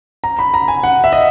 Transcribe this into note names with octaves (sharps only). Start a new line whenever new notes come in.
A#5
B5
A#5
G#5
F#5
E5
D#5